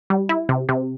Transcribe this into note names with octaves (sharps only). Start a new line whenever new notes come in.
G3
E4
C3
C3